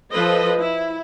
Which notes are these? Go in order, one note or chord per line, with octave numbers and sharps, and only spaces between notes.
F3 A4 B4 C5 D#5
E4